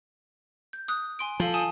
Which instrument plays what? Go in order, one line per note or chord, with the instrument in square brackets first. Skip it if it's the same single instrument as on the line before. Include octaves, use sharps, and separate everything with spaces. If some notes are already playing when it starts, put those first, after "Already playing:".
[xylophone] G6
D#6 F#6
G#5 C6 D7
[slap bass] F3 [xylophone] A4 F5 A5
[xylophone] G#5 A5 D#6